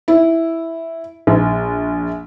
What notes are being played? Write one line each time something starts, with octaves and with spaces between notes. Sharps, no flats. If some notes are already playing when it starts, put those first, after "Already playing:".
E4
A#1